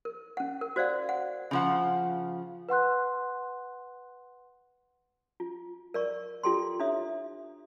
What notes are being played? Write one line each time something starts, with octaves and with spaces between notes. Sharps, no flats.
A#4
C#4 F#5
A#4
F#4 C5 D5 F5 F#5
F#5
C#3 F3 F#5
B4 F#5 C6 F#6
F4
A#4 D5 C#6
F4 G4 A4 G5 C6
D4 E4 C#5 E5 D#6